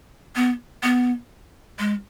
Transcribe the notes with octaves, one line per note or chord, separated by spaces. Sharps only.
B3
B3
G#3